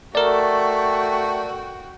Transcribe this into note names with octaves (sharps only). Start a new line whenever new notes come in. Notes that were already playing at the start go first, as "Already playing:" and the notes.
A3 F#4 A#4 D5 G5